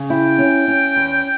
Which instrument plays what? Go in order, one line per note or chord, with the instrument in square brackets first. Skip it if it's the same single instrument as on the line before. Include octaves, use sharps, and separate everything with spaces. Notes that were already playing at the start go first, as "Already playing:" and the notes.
Already playing: [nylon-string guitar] C#3
[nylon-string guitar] E4 [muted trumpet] G5
[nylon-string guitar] C#4
C#4
E2